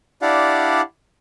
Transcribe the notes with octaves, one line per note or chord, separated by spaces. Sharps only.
D4 E4 G4 D5 F5 F#5